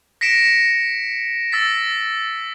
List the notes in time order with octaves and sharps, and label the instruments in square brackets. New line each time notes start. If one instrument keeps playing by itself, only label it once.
[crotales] A#6 B6 C#7 D7 E7
E6 A6 B6